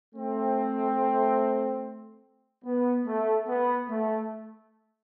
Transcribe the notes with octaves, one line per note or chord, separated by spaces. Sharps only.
A3 C4
B3
A3
B3
A3